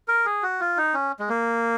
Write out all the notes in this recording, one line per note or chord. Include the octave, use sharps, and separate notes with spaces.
A#4
G#4
F#4
F4
D#4
C#4
G#3
A#3